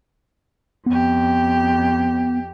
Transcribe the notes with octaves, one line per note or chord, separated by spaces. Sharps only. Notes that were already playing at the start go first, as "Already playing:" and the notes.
F2 B3 G4